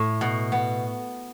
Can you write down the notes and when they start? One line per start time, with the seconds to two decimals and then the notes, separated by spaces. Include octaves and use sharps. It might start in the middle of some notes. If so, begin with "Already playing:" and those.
Already playing: A2
0.21 B2
0.52 B3